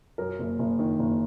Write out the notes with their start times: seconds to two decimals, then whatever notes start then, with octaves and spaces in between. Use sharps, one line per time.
0.18 F#2 A#4
0.39 F#1
0.59 F#1
0.79 D#3
0.99 F#1